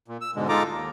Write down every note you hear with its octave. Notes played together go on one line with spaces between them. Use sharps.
A#2
E6
G#2 B2 D3 G#3
G#3 D#4 F4 A4 A#5 D6
D#2